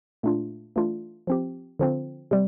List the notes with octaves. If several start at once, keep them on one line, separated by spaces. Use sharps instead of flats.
A#2 A3 D4 F4
E3 A3 D4 F4
F3 C4 G4
D3 F3 C4
C3 G3